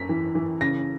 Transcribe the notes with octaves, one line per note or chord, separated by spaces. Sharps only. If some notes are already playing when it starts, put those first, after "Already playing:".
Already playing: F#2 B6
E3
E3
C#3 A#6